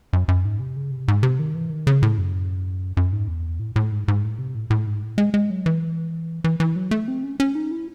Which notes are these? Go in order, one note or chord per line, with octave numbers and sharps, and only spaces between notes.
F#2
F#2
G#2
C3
C#3
C3
G#2
C3
D#3
E3
D#3
C#3
A2
F#2
F#2
G#2
E2
A2
A2
G#2
G#2
A2
C3
A2
A2
G#2
A2
G#3
G#3
F#3
E3
E3
E3
F#3
A3
C4
C#4
C#4
D#4
E4